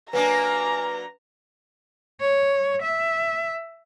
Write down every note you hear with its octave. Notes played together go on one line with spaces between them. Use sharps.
F#3 A#3 D4 B4 G#5 A#5
C#5
E5